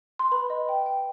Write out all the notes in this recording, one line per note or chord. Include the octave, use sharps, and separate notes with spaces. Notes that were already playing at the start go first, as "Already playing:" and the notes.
C6
B4 B5
D#5
G5
G5